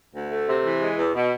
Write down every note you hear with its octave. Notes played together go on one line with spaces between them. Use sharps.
D2
A3
C3
E3
G#3
E2
B2